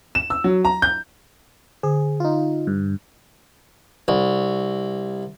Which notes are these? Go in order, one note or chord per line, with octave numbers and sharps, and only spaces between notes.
E7
E6
F#3
A#5
G6
D3 G#4
D#4 F4
G2
C2